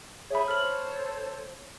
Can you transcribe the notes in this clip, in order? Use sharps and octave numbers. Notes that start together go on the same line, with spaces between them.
G#4 C#5 E5 B5
A4 C5 C#5 F6 F#7